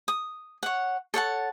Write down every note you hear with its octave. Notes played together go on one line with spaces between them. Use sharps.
D#6
C#5 F#5
A4 C#5 F#5 A5